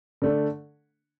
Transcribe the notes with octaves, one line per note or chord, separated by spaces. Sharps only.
D3 A3 D4